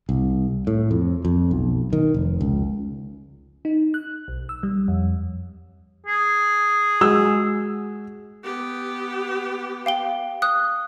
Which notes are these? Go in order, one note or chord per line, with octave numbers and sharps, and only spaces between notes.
C2
A2
F2
F2
B1
D#3
F1
C#2
D#4
F#6
B1
E6
G3
F2
G#4
G#3 F#4 E6
B3 G4
F5 G5 G7
D#6 F#6